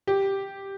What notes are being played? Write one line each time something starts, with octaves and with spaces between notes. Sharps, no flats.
G4